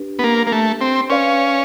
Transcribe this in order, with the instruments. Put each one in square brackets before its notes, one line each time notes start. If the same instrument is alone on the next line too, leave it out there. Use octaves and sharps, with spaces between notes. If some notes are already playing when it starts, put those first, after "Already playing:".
Already playing: [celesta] D4 G4 B4
[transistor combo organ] B3
A#3
A#3
A3
C4
[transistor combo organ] C#4 [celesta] B4 D5 F5